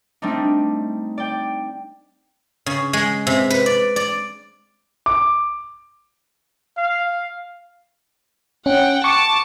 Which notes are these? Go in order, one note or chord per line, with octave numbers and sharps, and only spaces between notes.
G3 A3 C4 D4 D#4
D5 G5
C#3
G#3
C3
B4
D5
D5
D6
F5
C#4 F#5 G5
A5 C#6 D6